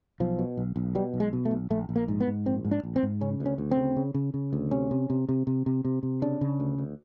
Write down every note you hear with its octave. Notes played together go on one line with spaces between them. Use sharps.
B1 F3
B2
B1
B1
B2 G3
B1
G#3
B2
A3
B1
A#1 A3
A#1
A#3
G#2
B3
G#2
A#1 C4
G#2
D4
A#1
C4
G#2
C#3 C#4
D2
C#4
D2
C4
C#3
C#3
C#3
C#3
D2
C3 C#4
C3
C3
C3
C3
C3
C3
C3
C#3 D4
C#3
D2
D2